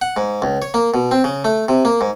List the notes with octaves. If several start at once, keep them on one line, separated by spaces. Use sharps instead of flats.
F#5
G#2
C#2
C#5
A#3
B2
C4
C#3
A3
C3
A#3
G#2